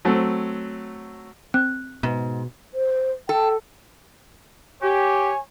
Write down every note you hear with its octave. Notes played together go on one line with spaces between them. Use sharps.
F#3 A3 C4
C4 F#6
G#2 B2 B3
C5
A4 G5
G4 C#5 G#5